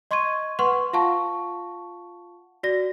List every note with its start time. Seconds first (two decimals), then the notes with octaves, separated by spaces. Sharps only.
0.11 D#5 C6 C#6 G#6 D#7
0.59 B4 F#5 C6 C#6
0.93 F4 F5 F#5 A5 C#6
2.63 F#4 D5 A#6